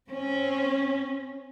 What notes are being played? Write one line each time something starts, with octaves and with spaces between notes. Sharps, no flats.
C4 C#4